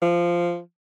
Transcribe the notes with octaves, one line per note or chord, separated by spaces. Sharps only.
F3